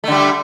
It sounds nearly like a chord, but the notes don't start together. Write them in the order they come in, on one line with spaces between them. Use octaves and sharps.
A3 D3 G3